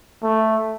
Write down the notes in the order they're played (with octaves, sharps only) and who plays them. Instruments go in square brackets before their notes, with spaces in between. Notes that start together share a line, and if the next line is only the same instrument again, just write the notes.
[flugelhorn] A3